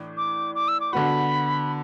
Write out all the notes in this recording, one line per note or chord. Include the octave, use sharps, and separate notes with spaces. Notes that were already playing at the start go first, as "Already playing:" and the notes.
Already playing: A2 E3 D4
D6
D6
E6
D6
D3 B3 F#4 B5